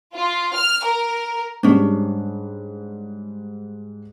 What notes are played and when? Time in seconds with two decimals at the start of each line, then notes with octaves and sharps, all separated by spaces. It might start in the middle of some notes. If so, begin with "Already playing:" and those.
0.15 F4
0.56 F6
0.86 A#4
1.63 G#2 G3 C#4 D4